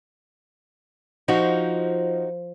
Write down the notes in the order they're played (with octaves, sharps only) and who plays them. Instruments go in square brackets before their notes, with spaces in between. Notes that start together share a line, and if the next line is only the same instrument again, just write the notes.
[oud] F3 [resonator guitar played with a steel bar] D#4 F#4